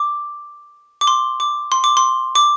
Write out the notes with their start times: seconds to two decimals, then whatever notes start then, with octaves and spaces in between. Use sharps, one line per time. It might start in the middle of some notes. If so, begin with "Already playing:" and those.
Already playing: D6
1.01 D6
1.07 C6
1.40 D6
1.72 C6
1.84 D6
1.97 C6
2.35 D6